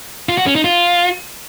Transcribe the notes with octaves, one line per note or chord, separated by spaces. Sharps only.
F4
F#4
C#4
D#4
F4